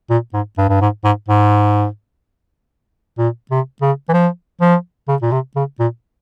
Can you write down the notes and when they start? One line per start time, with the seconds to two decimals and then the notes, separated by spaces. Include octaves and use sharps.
0.10 A#2
0.34 G#2
0.58 G2
0.69 G2
0.81 G#2
1.05 G#2
1.29 G#2
3.18 A#2
3.51 C3
3.82 C#3
4.09 E3
4.13 F3
4.61 F3
5.08 C#3
5.22 A#2
5.32 C3
5.56 C#3
5.80 A#2